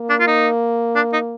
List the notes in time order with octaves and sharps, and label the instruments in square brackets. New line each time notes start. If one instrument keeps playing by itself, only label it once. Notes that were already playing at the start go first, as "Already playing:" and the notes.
Already playing: [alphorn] A#3
[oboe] D4
F4
D#4
D4
D#4